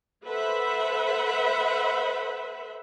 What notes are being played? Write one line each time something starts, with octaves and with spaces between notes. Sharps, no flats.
A4 B4 C5 E5 F#5 B5